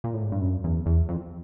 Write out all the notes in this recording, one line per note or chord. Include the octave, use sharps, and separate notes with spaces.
A#2
A2
G#2
G2
F#2
E2
E2
F2